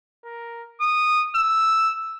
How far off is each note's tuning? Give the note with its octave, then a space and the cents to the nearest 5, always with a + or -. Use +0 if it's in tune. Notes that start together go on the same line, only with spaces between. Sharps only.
A#4 +5
D#6 -15
E6 +0